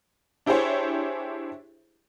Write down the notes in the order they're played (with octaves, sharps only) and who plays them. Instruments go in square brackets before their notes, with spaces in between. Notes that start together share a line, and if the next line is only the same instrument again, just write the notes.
[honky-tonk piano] D4 E4 G4 G#4 C5 C#5